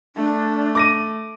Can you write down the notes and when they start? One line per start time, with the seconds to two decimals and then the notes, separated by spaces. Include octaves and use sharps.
0.16 A3 D4
0.75 D6 A#6 D#7